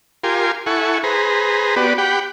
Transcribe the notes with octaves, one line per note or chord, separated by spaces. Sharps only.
F4 G4 A#4 G#5 C6
E4 A4 F#5 G#5 C#6
G#4 B4 C5 A#5
B3 F#4 G4 B4 D5
G4 F#5 G5 B5